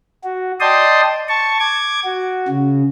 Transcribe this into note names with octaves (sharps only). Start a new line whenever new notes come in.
F#4
D5 D#5 G5 A5 C6 D#6
A5 C#6
D6 G#6
F#4
C#3